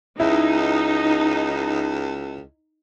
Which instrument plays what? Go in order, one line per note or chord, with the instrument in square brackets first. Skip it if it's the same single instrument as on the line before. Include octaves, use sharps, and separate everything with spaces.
[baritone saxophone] C#2 [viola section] D#4 [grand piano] E4